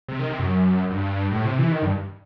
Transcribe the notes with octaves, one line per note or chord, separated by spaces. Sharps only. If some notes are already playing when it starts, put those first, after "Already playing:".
C3
D#3
C3
F#2
G2
A2
C3
E3
D#3
G2